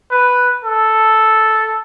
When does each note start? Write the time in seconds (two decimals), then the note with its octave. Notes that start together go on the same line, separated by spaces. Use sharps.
0.11 B4
0.64 A4